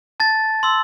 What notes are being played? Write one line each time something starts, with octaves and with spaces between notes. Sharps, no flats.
A5 A6
C6 E6